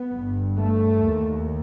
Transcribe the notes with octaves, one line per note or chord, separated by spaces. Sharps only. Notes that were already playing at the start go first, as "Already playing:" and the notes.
Already playing: B3
G1 G2
A3
D#2